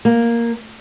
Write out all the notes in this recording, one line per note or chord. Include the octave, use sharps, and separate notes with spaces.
A#3